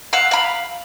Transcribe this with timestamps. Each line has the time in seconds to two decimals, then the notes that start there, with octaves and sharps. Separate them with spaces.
0.13 F5 F#5 E6
0.31 F5 B5